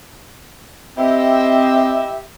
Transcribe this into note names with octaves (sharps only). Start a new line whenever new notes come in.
C4 E4 G4 D#5 E5